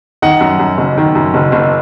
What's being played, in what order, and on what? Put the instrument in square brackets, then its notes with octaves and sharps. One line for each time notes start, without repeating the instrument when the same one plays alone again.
[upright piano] D#3 D#5 F#5
F#2
F#2
F#1
D#3
F#2
F#1
F#1